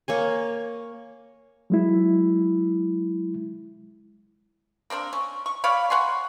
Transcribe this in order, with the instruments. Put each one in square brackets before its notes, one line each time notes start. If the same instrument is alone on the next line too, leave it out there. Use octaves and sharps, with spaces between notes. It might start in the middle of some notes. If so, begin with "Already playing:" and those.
[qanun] A#3 C#5 G#5
[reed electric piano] F#3 G#3 E4
[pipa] A#3 C4 D4 A#4
C#4
C#6
C#5 D5 F5 B5
C#5 F#5 G#5 C6